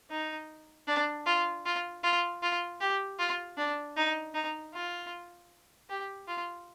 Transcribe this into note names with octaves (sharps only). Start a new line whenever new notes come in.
D#4
D4
F4
F4
F4
F4
G4
F4
D4
D#4
D#4
F4
G4
F4